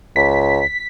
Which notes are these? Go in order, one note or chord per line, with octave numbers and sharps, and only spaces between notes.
C#2 B6